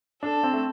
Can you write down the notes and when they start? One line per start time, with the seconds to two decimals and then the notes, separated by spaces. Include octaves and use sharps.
0.23 D4 A4
0.43 C4
0.53 A3